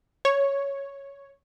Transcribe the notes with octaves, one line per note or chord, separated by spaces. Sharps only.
C#5